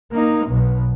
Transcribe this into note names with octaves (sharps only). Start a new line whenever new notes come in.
A#3 D#4
B1 B2